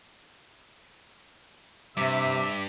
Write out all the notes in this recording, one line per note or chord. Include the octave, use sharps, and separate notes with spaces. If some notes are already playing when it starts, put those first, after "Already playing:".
G2 C3 E5 D6 B6